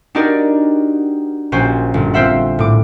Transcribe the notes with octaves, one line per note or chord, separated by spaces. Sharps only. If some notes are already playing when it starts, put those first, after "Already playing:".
D4 D#4 F#4 G4 A#4 D5
A#1 C#4 F#4 G4 C5
G1
C4 F4 C5 E5 F#5
A2 D6